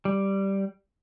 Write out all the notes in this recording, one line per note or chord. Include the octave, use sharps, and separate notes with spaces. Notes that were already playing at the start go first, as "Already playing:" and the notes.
G3